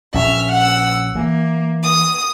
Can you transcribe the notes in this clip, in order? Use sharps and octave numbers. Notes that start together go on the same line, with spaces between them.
A#1 C#4 E5 F6
F#5 E6
E3 A#3
D#6